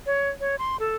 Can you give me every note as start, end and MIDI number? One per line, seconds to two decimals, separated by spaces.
0.06 0.29 73
0.40 0.56 73
0.59 0.77 84
0.80 0.96 69